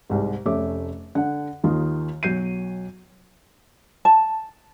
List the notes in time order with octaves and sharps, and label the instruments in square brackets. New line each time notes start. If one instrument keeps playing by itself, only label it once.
[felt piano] C2 G#2
F1 A3 C#4 E5 D6
D3 F#5
D#2 D#3 D#4 F4
B1 F#3 G6 C7 D#7
[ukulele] A5